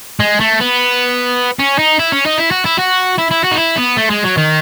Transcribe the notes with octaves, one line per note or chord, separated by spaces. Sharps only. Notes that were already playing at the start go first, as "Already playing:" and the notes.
G#3
A3
B3
C#4
D#4
E4
C#4
D#4
E4
F#4
E4
F#4
E4
E4
F#4
D#4
E4
B3
A3
G#3
F#3
D#3